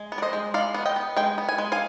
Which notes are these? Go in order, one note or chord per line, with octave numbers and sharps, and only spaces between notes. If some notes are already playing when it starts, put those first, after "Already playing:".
Already playing: G#3
B3
D5
C5 D#5
G#3
G#3 D5 F5
B3
D#5 G5
B3
G#3 D#5 G5
B3
G#5
G#3
F5 G#5